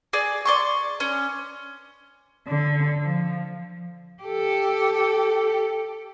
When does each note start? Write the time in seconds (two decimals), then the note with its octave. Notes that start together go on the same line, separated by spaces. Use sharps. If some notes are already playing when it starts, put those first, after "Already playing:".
0.13 G#4 D5
0.45 D5 C6 C#6
1.00 C#4
2.47 D3
3.02 F3
4.23 G4 A4